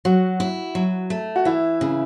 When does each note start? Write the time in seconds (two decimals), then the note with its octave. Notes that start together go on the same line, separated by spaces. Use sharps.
0.05 F#3 F#4
0.40 E4
0.75 F#3
1.10 A3
1.36 F#4
1.45 E3 E4
1.81 C#3